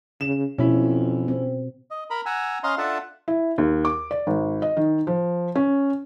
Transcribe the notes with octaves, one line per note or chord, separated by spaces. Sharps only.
C#3 E7
F2 B2 C#4 E4
C4
D#5
A#4 A#5 B5
F#5 G#5 A#5 E6
C#4 D#5 F5 A#5 C6
D4 F4 A4 E5 F#5 A5
E4
D#2
D6
D5
G#1
D#5
D#3
F3
C#4